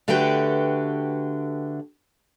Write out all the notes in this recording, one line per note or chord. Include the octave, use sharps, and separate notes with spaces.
D3 A3 F#4 G4 B4 G5